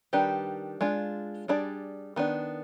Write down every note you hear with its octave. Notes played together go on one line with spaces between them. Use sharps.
D#3 G3 D4 G4 B4
G#3 D4 F4
G3 D4 G#4 D5
D#3 B3 D4